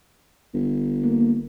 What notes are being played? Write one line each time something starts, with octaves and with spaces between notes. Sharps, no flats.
G1
A#3